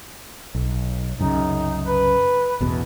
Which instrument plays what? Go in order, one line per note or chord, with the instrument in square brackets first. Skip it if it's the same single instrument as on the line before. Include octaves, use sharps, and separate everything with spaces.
[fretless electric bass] B1
[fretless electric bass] C2 F#2 C#3 [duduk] D#4
[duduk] B4
[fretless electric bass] A1 E2 B2